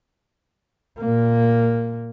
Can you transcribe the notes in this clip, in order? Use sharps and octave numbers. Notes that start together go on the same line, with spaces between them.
A#2 A#3